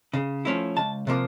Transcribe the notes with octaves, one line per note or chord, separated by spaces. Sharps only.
C#3
F3 A3 C#4 E4
C#2 A5
C3 F3 A#3